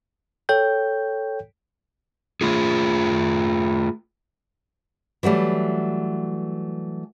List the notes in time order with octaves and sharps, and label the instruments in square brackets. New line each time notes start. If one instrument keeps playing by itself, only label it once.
[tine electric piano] A4 C#5 G5 G6
[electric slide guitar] A3 F4 G#4
[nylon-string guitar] E3 F#3 G3 A3